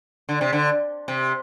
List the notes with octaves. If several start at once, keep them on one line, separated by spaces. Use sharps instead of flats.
D3
C3
D3
C3